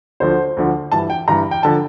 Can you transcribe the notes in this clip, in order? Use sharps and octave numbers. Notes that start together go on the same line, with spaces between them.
D2 D3 F3 C5
D2 D3 F3
G2 E3 A5
G5
G2 E3 A#5
G5
D3 F3 A5